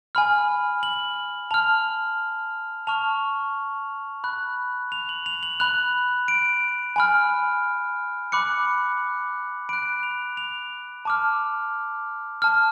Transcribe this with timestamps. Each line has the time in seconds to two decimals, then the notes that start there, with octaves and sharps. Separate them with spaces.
0.15 G#5 B5 F6
0.83 F#7
1.51 A5 F6 F7
2.87 A5 C#6 F6 F7
4.24 B5 F#6
4.92 F7
5.09 F#7
5.26 F7
5.43 F#7
5.60 B5 F#6 F7
6.28 D7
6.96 G#5 B5 F6
8.32 B5 D6 F#6 C#7
9.69 B5 F#6 D7
10.03 F7
10.37 F7
11.05 A5 D6 F6
12.42 A5 F6